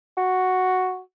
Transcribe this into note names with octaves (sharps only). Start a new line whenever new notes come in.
F#4